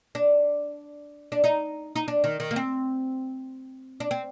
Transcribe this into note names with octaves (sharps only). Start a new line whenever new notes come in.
D4
D4
D#4
D#4
D4
D#3
D#3
A#3
C4
D4
C4